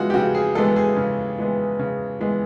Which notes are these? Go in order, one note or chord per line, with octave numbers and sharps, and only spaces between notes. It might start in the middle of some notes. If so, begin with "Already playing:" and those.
Already playing: C#3 E3 G#3 B3 F4 F#4
G4
C#3 F#4
G#4
E3 G#3 B3 A4
G#4
C#3
E3 G#3 B3
C#3
E3 G#3 B3